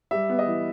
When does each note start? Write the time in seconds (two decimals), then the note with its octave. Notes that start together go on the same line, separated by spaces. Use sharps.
0.11 G3 E5
0.30 B3
0.39 D#5
0.47 E3